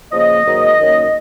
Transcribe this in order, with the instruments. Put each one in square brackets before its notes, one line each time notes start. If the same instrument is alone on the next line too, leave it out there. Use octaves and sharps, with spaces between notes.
[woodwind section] C#3 F3 A#3 D#5
G#2 D#3 F#3 A#3
F#2 D#3 A#3 C#4